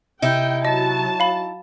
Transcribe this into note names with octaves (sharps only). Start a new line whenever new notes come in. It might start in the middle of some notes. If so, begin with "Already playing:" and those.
C3 D#4 E4 G5
F#3 D#5 A5
F5 B5